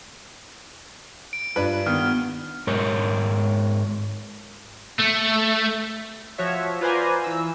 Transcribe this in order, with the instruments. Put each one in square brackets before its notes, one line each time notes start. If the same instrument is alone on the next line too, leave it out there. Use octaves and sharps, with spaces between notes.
[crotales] D7
[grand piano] G2 D4 [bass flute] F4 [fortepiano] B4
[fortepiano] D#3 [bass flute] B3 [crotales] F6
[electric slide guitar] G#2 A#4 C#5
[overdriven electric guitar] A3
[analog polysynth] F3 F#4 C#5 E5
F4 B4 C5 D5 G#5 A#5
E3 E6